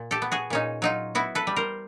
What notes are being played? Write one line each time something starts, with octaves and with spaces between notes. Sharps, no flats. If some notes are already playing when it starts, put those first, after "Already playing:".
Already playing: A#2
G4 A4
B3
F#4 G#4
A#2 C#4 D#4
F#3 D#4 F4
B3 E4 F#4
A4 B4
G3
A#4 C5